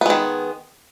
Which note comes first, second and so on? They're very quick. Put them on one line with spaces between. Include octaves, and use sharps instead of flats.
B3 G#3 D#3